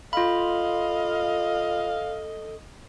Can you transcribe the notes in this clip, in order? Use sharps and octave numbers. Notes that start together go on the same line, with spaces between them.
F4 A4 D#5 F5 B5